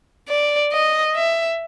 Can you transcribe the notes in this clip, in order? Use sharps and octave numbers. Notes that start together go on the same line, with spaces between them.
D5
D#5
E5